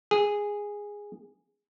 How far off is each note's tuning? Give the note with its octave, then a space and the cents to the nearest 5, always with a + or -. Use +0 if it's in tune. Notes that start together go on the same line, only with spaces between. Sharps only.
G#4 -10